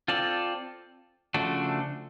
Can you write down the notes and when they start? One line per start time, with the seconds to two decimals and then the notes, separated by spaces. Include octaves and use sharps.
0.08 C4 F4 A4 D5
1.34 C#3 F3 A3 D4 F#4